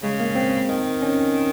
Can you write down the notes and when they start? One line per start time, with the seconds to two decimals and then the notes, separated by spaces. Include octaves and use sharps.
0.02 C#3 G#3
0.20 A#3
0.35 C4
0.69 D#3
1.02 C#4